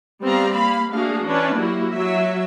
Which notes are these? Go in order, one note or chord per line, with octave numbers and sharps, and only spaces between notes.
G3 B3 C4 D5 F5 A#5
A#3 F5 B5
A3 A#3 D4 F#4 G#4 F5
E3 C#4 D4 B4 D5
F#3 A#3 E4 F#4 G4
F#3 E5